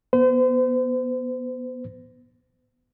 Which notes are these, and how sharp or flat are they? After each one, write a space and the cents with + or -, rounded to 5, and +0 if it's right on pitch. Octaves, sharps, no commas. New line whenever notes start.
B3 -15 C5 -40